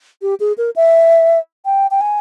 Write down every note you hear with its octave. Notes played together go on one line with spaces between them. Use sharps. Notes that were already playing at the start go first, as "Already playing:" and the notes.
G4
G#4
A#4
E5
G5
G5
G#5